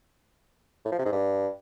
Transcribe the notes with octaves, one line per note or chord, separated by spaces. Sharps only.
A2
F3
C3
G#2
G2